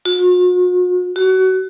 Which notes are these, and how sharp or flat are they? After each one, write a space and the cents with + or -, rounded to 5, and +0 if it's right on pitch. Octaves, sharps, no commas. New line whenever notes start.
F#4 -45
F#4 +25